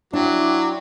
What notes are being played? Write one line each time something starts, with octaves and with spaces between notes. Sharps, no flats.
F#3 D4 E4 G5 D6